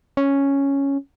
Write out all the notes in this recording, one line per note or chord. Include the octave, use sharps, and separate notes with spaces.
C#4